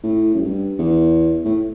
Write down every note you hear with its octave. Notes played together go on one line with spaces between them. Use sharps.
A2
F#2
G2
E2
A2